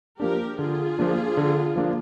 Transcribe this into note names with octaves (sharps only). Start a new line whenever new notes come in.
F3 A#3 D4 G4 A#4
D3 F4 G#4
F3 A#3 D4
D3
F3 A#3 D4